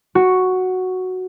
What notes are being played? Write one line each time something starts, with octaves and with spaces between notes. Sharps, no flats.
F#4